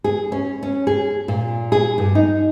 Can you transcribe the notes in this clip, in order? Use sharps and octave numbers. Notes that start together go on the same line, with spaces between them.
G#4
C#4
C#4
G#4
A#2
G#4
G2
D#4